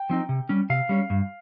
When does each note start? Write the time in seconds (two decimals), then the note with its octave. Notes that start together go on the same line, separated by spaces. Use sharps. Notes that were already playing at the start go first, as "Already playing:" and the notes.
Already playing: G5
0.10 F3 C4 D#4
0.29 C3
0.49 G3 C#4
0.70 C3 F5
0.89 G3 C#4
1.10 G2